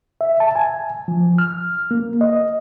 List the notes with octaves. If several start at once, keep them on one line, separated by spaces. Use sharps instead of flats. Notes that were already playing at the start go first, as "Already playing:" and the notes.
E5
A5
G#5
F3
F6
A#3
D#5